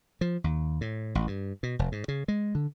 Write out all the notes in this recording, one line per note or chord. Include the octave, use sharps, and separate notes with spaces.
F3
D#2
A2
A1
G2
B2
F1
G#2
C#3
G#3
D3